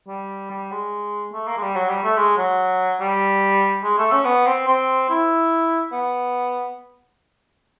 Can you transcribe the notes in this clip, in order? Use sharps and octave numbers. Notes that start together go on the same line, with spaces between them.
G3
G3
G#3
A3
A#3
G#3
G3
F#3
G3
A3
G#3
F#3
G3
G#3
A3
C#4
B3
C4
C4
E4
B3